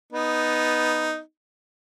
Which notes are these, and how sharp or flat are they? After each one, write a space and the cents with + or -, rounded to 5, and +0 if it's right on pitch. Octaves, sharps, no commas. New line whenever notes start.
B3 +0 D#4 +0